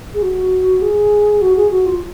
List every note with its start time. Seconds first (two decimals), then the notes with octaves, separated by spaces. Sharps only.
0.14 G#4
0.22 F#4
0.82 G#4
1.42 F#4
1.56 G#4
1.71 F#4
1.86 F4